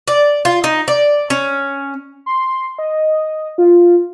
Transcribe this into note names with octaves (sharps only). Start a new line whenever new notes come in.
D5
F4
D#4
D5
C#4
C6
D#5
F4